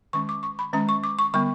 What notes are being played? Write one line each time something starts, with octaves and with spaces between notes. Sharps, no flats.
D#3 G#3 C#4 C#6
D6
C#6
B5
D#3 G#3 C#4 A#5
C#6
D6
C#6
D3 G3 B3 C#6